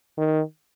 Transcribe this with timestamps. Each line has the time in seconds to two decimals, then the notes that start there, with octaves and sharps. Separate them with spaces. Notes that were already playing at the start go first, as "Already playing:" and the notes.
0.18 D#3